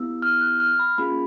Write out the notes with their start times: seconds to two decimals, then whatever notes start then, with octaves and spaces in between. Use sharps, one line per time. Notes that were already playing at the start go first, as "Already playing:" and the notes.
Already playing: B3 E4 G4 E6
0.22 F6
0.41 F#6
0.60 F6
0.79 B5
0.98 A#3 C#4 F4 G#4 B5